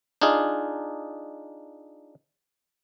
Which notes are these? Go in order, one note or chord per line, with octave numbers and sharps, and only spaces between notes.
D4 D#4 F4 G#4